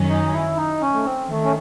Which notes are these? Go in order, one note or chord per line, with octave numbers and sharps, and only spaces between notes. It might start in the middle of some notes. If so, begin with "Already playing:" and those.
Already playing: F#2 D#3 F#3 C#4
D#4
E4
D#4
C#4
A3
C4
D#3 A3
C#4